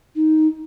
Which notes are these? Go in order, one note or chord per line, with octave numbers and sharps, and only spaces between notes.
D#4